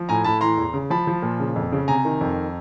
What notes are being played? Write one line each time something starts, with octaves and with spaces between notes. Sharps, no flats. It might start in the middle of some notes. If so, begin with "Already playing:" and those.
Already playing: F3
A2 G#5 A#5
A2 A5 B5
E3 A#5 C6
E2
C#3
F3 A5 B5
F3
A#2
C#3
F2
C#3
C3 G#5 A#5
D#3
F2